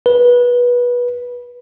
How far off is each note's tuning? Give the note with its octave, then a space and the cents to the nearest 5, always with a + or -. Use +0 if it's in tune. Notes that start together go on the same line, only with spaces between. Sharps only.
B4 -20